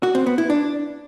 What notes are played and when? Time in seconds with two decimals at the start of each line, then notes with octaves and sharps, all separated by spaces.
0.03 F#4
0.15 C4
0.26 B3
0.38 E4
0.50 D4